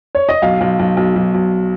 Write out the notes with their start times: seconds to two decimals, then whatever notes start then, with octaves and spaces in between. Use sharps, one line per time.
0.15 C#5
0.29 D#5
0.42 B1 F5
0.61 B1
0.79 B1
0.97 B1
1.16 B1
1.34 B1